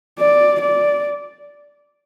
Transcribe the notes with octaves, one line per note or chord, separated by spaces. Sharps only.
D5
D5